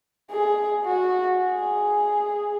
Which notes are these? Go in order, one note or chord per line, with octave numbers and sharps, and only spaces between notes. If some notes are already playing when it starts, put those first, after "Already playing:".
G#4
F#4
G#4